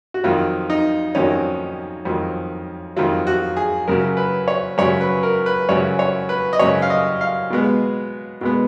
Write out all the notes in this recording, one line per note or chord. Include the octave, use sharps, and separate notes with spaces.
F#4
F2 D#3 F#3 F4
D#4
F2 D#3 F#3 C#4
F2 D#3 F#3
F2 D#3 F#3 F4
F#4
G#4
F#2 C#3 F#3 A#4
B4
C#5
F#2 C#3 F#3 C#5
B4
A#4
B4
F#2 C#3 F#3 C#5
C#5
B4
D#5
F#2 C#3 F#3 C#5
F5
D#5
F5
B2 G#3 B3
B2 G#3 B3